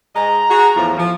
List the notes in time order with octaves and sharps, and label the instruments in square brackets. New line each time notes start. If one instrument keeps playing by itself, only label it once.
[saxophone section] G#2 G#3 D#5 [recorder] A#5
[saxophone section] F#4 G#4
E2 A2 F3
F3